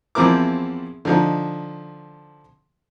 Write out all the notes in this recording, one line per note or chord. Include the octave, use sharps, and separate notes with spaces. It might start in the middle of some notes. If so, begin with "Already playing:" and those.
E2 F3 C4 E4 A#4 D6
D3 F3 D#4